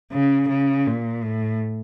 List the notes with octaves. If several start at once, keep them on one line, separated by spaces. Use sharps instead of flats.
C#3
C#3
A#2
A2